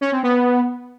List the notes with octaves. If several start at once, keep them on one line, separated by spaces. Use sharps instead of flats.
C#4
C4
B3